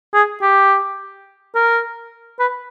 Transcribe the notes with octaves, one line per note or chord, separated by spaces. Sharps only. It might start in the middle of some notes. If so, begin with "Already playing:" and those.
G#4
G4
A#4
B4